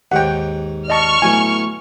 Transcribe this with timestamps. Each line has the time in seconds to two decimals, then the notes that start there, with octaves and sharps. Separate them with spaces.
0.12 D#2 G#2 C#5 F#5 G5
0.88 D5 D#5 A5 C#6 F6
1.22 A2 F#3 B3 G#5